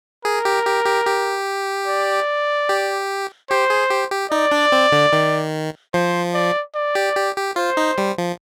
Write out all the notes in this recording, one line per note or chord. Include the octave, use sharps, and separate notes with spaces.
G#4 A#4
G4
G4
G4
G4
D5
G4
G4 C5
G#4
G4
G4
D#4 D5
D4
C4
D3
D#3
F3 C5
D5
D5
G4
G4
G4
F4 C5
D#4
G3
F3